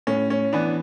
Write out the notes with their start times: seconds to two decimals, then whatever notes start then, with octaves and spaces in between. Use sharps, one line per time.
0.07 A2 C#4
0.30 C#4
0.53 E3 B3 D4